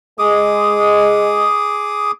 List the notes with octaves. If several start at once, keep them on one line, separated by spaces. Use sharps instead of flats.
G#3 G#4 D6 D#6